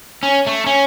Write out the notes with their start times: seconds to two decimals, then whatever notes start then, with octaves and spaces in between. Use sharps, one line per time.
0.23 C#4
0.47 A3
0.66 C#4